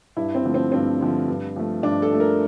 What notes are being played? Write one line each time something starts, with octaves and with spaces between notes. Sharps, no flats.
G2 E4
C4
D3 F3 A3
C4
G2 C4
D3 F3 A3
G2
F3 A3
G2 D4
A4
F3 A3
A#4